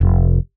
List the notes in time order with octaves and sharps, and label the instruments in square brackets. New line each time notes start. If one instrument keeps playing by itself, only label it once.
[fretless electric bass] F1